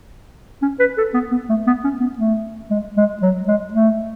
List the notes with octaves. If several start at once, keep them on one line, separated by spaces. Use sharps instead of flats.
C#4
B4
A4
B3
B3
A3
B3
C#4
B3
A3
G#3
G#3
F#3
G#3
A3